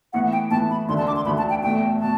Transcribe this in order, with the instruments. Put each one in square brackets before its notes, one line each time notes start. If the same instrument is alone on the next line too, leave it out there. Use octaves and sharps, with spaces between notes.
[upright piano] A2 E3 B3 [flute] F#5
[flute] G5
[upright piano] A2 E3 B3 [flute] A5
[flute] B5
[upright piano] E1 D2 D3 [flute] C6
[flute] A5
D6
C6
[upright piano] E1 D2 D3 [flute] B5
[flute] A5
G5
[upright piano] E2 B2 A3 [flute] G5
[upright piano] B2 [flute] A5